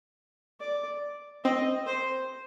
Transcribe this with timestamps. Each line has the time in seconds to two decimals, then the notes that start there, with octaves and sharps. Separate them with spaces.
0.60 D5
1.45 C4 D#5
1.87 C5